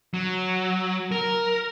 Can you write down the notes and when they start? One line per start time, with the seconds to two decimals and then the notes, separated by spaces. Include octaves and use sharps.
0.14 F#3
1.12 A#4